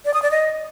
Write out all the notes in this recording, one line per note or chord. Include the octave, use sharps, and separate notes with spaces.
D5
D#6
D5
D#5